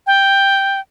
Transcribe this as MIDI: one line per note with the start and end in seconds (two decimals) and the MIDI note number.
0.07 0.80 79